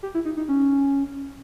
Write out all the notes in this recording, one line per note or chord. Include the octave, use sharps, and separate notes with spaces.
G4
E4
D#4
D#4
C#4